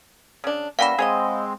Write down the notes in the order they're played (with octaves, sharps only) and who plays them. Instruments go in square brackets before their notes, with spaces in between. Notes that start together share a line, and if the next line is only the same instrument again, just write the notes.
[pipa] C#3 D4
[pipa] E3 G3 C#4 [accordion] A#3 [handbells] F5 F#5 B5
[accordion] G#3 C4 [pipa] G#4 C#5 D#5